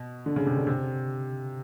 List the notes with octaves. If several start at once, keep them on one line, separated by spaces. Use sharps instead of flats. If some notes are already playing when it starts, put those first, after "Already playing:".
Already playing: B2
D3
C#3
C3
D3
C3